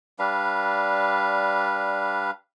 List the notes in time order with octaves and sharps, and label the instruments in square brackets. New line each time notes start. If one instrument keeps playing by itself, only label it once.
[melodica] G3 D4 B4 F5